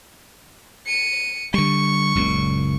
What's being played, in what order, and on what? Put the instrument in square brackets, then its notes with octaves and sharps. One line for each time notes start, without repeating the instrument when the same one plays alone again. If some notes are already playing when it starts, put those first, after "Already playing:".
[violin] C#7 D#7
[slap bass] D3 G3 [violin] C#6
[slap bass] F#1 C#2 A#2